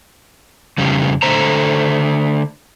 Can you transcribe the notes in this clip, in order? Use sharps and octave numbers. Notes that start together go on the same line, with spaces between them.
F2 C#3 G3
D3 A3 C5 A#5